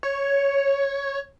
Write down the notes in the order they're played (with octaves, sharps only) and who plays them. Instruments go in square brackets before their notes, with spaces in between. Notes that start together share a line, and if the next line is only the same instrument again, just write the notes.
[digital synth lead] C#5